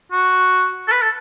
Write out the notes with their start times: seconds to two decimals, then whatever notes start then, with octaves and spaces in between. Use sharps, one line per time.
0.12 F#4
0.88 A4
0.92 B4
1.02 A4